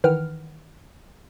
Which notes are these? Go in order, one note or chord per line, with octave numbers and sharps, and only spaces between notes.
D#3 E3 B4 F#5 G5 F6